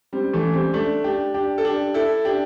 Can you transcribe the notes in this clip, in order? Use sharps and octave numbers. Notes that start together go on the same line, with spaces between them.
G3 C4
E3 A3
G3 C4
A3 D4
D4 G4
D4 G4
A4
D4 G4
E4 A4
D4 G4